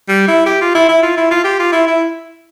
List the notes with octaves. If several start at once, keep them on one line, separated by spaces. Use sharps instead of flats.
G3
E4
G4
F4
E4
E4
F4
E4
F4
G4
F4
E4
E4